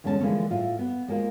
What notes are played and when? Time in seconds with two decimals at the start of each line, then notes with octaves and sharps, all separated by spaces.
0.04 E2 D3 G#3 C#4 C5 A5
0.20 D3 E3 F3 G#3 A#3 C#4
0.50 A2 F4 E5
0.79 B3
1.08 G#3 A#3 F4 C5